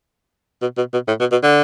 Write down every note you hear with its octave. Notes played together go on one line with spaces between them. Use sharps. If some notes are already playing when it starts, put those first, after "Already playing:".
B2
B2
B2
A2
B2
B2
D3